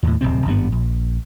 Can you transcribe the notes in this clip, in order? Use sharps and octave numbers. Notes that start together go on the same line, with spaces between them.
D#2 A2
D1 A#1 C3 C4
G#1 G2 G3 B3
A#1